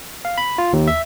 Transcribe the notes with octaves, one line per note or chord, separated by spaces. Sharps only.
F5
B5
F4
D#2
E5